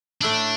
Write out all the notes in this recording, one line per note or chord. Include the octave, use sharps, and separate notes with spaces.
A2 A3 D4 E4